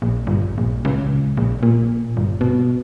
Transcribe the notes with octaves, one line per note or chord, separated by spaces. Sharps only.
A#1
G1
A#1
C#2
A#1
A#2
G1
B2